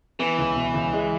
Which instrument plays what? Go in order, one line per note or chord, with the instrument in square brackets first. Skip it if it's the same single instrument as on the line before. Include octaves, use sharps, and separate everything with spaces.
[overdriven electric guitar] E3 [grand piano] B3
[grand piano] C#2
B2
C#2
G#3